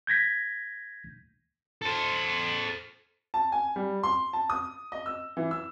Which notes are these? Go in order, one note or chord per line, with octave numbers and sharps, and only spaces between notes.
G6 G#6 A#6 B6
A4 C5
A5
G#5
G3
C6
A5
D#6
D#5
E6
E3
E6